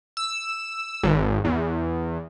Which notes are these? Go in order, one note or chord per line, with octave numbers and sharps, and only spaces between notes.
E6
G#1
E2